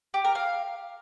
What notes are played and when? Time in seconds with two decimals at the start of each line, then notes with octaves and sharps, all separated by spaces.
0.14 G4
0.25 A#4
0.35 F5